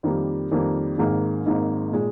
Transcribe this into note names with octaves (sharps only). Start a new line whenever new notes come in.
F2 D#3 G3 A#3
F2 D#3 G3 A#3
G#1 G#2 D#3 A#3 D#4
G#1 G#2 D#3 A#3 D#4
A#2 G#3